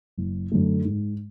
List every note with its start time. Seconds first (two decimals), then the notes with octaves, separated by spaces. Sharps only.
0.17 F#1
0.52 F#2 D3 A3
0.85 G#2